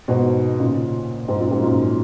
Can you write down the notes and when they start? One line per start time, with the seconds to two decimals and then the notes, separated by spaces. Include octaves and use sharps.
0.08 G#2 B2
0.59 A#2 C#3
1.28 G#2
1.40 F#2 A#2
1.51 G#2
1.63 F#2 A#2